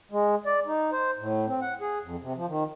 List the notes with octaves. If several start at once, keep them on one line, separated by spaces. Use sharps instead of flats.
G#3
D5
D#4
C5
A2
C4
F#5
G#4
F2
C3
F3
D#3